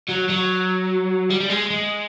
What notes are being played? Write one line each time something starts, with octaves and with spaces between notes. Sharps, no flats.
F#3
F#3
G3
G3
G#3
G#3